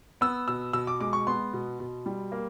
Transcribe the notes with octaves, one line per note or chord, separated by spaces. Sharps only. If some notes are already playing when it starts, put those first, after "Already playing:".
B3 E6
B2 E6
B2 E6
D6
G#3 D6
C#6
B3 C6
B2
B2
G3
A#3